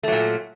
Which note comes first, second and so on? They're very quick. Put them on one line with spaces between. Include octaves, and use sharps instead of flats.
A3 F#3 A#2